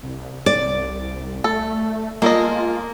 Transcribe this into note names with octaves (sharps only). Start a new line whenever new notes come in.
C2
D5
A3 A4
G#3 A#3 F4 A4 D#5